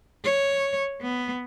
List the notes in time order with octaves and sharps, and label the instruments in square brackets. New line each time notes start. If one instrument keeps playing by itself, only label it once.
[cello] C#5
B3